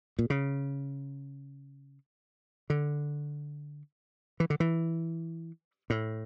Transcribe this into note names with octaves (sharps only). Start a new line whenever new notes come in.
A#2
C#3
D3
E3
D3
E3
A2